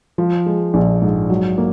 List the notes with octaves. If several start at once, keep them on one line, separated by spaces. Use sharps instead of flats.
F3
G#3
A#1
G#2
F#3
A#3